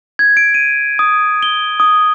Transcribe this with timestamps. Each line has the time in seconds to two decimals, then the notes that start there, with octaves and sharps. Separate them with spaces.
0.19 G#6
0.37 D7
0.54 D#7
0.99 D#6
1.43 G7
1.80 D#6